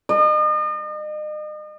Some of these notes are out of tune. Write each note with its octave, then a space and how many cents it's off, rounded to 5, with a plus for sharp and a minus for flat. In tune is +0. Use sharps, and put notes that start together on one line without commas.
D#5 -40